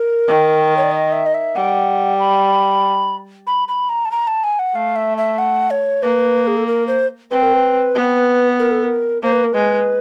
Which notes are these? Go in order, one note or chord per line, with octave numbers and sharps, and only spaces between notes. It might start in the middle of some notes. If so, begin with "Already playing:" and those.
Already playing: A#4
D#3
C#5
D5
D#5
E5
D#5
E5
G3 F#5
B5
B5
B5
A#5
A5
A#5
A5
G#5
F#5
A3 F5
E5
E5
F#5
C#5
A#3 B4
G#4
A4
A#4
C5
C4 B4
A#4
B4
B3
A#4
A4
A#4
A#3 C5
B4
A#4
G#3 B4